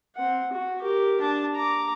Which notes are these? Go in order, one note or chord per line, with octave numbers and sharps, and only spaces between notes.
C4 F#5
F#4
G4 A#4
D4 A5
A#5 D6